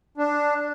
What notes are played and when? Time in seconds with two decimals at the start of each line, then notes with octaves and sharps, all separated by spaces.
0.17 D4